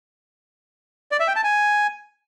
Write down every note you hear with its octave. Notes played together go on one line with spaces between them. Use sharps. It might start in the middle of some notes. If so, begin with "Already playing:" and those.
D5
E5
G5
A5
G#5